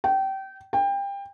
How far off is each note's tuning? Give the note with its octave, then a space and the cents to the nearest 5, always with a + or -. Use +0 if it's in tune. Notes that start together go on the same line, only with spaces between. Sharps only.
G5 -25
G5 +25